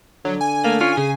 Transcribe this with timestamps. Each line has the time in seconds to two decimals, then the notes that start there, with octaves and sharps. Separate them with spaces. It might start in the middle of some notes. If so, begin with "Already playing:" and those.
0.25 D3 F#3
0.41 G#5
0.64 A3 A#3
0.81 C#4 F4
0.97 C#3 G#4